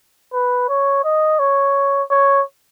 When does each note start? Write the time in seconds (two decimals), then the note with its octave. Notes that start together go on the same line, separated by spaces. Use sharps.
0.33 B4
0.69 C#5
1.04 D#5
1.39 C#5
2.10 C#5